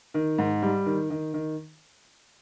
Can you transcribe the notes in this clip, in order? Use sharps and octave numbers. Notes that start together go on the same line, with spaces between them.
D#3
G#2
G3
D#3
D#3
D#3